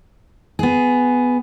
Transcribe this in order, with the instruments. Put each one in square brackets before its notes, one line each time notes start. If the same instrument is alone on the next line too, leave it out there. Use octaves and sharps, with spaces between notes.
[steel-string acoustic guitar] B3 G#4